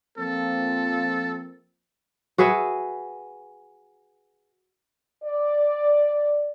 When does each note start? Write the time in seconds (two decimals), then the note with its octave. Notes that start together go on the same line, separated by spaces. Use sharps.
0.18 F3 A#3 C4 A4
2.38 F#4 G#4 B4 E5
5.24 D5